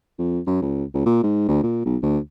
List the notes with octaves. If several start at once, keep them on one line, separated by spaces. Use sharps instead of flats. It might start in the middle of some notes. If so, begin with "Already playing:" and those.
F2
F#2
C#2
C#2
A#2
G#2
D2
A#2
B1
D2